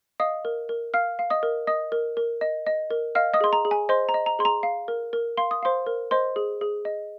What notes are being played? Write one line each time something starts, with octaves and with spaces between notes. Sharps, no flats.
D#5 F5 D#6
A#4
A#4
F5 F6
F5
D#5 D#6
A#4
D#5 D#6
A#4
A#4
D#5
D#5
A#4
D#5 F5 F6
D#5 D#6
G#4 C6
A#5
G#4
G#5
C5 D#5 C6
A#5
D#5
A#5
G#4 C6
A#5
F5
A#4
A#4
F5 C6
D#6
C5 F5 C6
A#4
C5 D#5 C6
G#4
G#4
D#5